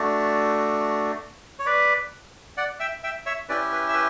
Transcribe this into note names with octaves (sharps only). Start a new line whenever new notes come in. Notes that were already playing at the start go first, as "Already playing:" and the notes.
Already playing: A3 D4 F#4
C#5
B4 D5
D5 F#5
E5 G5
E5 G5
C#5 E5
C#4 E4 G4 B4 D5
B4
E5
B4